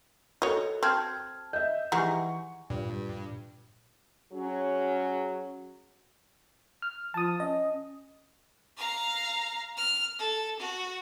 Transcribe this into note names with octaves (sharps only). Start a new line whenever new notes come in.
F#4 A4 C#5 D#5
C4 A5 F6 G#6
D#5 E5 G6
E3 G3 G#3 D#4 F#5 G#5 C#6
G2 A#2
F#3 C#4 G#4
F6
F3 A5 D#6
C#4 D#5
F5 A#5
F6
A4
F#4